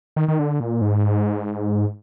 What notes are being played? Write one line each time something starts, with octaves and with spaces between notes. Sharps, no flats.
D#3
D#3
D3
A#2
G#2